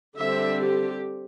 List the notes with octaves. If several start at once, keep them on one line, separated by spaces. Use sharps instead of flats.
D3 G3 C4 E5
G4